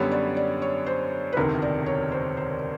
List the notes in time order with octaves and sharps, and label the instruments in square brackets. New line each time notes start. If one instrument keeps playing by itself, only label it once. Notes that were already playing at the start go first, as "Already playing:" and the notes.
Already playing: [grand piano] F#2 D3 G3 B3 [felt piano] C#5
[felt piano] D5
D5
C#5
C5
B4
[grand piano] E1 D2 C3 D#3 [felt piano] A#4
[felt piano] D5
C#5
C5
C5